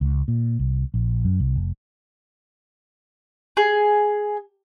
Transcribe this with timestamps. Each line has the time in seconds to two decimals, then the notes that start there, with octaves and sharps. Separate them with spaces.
0.01 C#2
0.28 A#2
0.59 C2
0.94 A#1
1.25 F#2
1.40 C2
1.56 F1
3.57 G#4